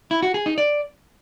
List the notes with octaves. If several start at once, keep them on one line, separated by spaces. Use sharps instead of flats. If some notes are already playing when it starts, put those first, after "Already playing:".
E4
F#4
G#4
D#4
D5